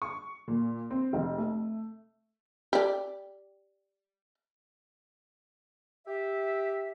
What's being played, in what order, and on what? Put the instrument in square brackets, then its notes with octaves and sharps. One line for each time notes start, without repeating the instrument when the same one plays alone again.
[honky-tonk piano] C#6
A#2
C4
F1
A3
[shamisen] G4 D5
[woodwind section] G4 E5